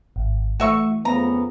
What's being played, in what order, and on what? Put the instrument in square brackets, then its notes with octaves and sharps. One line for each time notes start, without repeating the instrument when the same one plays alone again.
[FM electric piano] G#1
[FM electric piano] E3 A3 [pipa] F#4 E5 C#6
[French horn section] F2 C#3 B3 [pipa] A#5